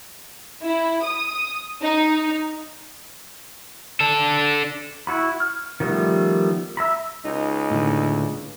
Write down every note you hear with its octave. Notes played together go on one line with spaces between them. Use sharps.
E4
D#6
D#4
D4 A4
E4 F#4 B5
F6
D#3 F3 G3 A3 B3
E5 A#5 B5
C#2 D#4
A2 D3